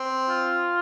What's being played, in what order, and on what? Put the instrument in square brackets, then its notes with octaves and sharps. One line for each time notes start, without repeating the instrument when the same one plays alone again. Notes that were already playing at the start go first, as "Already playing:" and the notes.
Already playing: [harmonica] C4
[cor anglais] F4